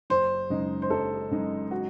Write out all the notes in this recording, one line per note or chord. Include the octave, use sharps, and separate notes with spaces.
F#1 C5
F#2 C#3 G#3 D#4
C5
F#1 A4
F#2 C#3 G#3 D#4
F#4